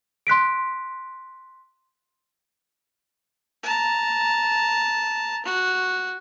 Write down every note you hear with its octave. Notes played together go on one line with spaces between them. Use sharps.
C6 F#6 B6 D7
A5 A#5
F#4